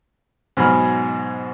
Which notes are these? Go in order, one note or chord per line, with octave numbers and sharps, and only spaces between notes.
G#2 B2 F#3 G#3 B5 F6